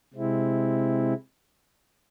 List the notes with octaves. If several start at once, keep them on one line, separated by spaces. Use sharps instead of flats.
C3 G#3 C4 E4